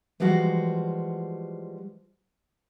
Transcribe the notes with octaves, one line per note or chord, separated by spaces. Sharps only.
E3 F3 G3 G#3 F#4 C5